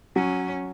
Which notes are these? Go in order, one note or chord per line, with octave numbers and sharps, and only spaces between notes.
F#3 C#4